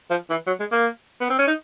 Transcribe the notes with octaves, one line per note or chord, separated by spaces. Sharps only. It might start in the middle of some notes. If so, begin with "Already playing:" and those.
F3
E3
F#3
G#3
A#3
B3
C4
C#4
D#4